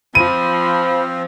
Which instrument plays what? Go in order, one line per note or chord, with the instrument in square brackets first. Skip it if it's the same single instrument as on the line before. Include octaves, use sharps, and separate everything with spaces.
[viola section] F3 [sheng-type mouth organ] C4 [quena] B5 [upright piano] D#7